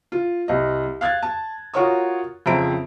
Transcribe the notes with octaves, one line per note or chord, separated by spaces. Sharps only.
F4
C2 D#5
F5 F#6 G#6 A6
A5
F4 F#4 A#4 C#5 C#6 D#6
F2 C#3 C4 E5 A#5 D7